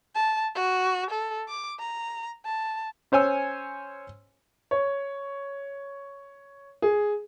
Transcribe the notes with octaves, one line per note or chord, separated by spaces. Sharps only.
A5
F#4
A4
D6
A#5
A5
C#4 C5 C#5 G#5 E6
C#5
G#4